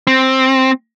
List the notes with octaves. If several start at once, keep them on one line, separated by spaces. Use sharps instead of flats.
C4